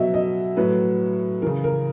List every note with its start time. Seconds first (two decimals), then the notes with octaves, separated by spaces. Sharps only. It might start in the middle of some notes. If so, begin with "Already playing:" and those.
Already playing: B2 F#3 D#5 E5
0.14 D#5
0.57 A2 F#3 B4
1.42 C#3 E3 A#4
1.64 A#4